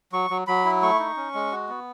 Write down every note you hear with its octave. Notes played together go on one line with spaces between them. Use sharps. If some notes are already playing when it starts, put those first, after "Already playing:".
F#3 C#6
F#3
F#3 B5
E4
A3 C#6
D#4
C#4
G#3
F#4
B3